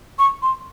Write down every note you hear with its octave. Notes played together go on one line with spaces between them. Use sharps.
C#6
C6